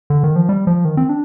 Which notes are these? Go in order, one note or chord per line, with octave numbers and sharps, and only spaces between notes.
D3
D#3
F3
G3
F3
D#3
C4
D4